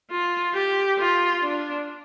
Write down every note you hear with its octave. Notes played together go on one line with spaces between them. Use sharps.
F4
G4
F4
D4